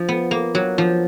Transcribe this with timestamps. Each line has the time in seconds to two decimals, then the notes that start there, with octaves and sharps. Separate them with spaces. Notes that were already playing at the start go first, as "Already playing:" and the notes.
Already playing: F3
0.09 B3
0.31 A#3
0.55 F#3
0.78 F3